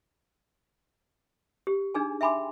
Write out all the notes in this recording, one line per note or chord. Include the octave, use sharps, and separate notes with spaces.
G4
D4 D#4 G#4 G#5
E5 G5 G#5 B5 C6 D6